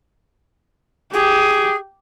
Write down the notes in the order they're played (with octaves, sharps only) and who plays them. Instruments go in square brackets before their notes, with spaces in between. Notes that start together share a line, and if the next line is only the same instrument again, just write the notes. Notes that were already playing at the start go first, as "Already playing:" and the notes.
[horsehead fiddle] G4 [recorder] G#4